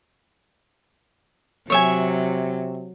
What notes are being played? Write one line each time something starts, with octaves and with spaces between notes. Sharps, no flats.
C3 F#3 C#5 E5 G#5